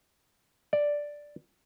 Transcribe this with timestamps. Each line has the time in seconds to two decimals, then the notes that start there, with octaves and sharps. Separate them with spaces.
0.73 D5